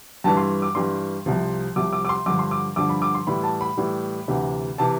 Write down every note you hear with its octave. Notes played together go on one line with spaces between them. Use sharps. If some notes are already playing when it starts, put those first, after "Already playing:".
G2 E3 G3 A5
C6
D6
G2 E3 G3 C6
C2 C3 F3
C2 C3 F3 D6
D6
D6
C6
G2 D3 F3 D6
C6
D6
G2 D3 F3 D6
B5
D6
C6
A2 E3 G3 B5
A5
B5
A2 E3 G3
D2 C3 E3
C3 E3 A5